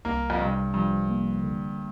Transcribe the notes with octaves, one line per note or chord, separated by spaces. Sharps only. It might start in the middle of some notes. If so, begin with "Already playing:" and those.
C2 A#3
F2
G2 C3
G2 F3
A#3
D3